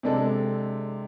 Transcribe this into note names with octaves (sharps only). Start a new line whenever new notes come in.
C3 G#3 D4 A4